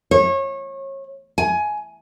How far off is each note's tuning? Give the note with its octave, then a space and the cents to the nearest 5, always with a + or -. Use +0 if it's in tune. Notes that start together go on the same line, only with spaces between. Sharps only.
C#5 -30
G#5 +15